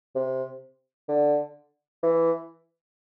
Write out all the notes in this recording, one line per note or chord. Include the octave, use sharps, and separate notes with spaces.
C3
D3
E3